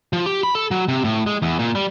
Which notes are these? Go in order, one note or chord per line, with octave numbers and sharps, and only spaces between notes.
F3
G4
B5
A4
F#3
C3
A2
G#3
E2
A#2
G3